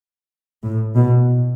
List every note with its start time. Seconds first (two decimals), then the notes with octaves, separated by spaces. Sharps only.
0.65 A2
0.96 B2